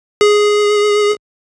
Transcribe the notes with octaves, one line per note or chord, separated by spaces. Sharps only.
G#4